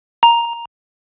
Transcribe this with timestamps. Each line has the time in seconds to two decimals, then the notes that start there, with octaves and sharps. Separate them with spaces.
0.23 A#5